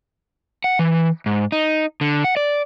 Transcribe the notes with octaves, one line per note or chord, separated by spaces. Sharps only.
F#5
E3
G#2
D#4
D3
F#5
D5